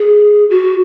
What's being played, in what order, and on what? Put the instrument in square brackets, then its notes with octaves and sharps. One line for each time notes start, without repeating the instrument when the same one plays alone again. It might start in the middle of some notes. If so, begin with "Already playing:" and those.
Already playing: [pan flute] G#4
F#4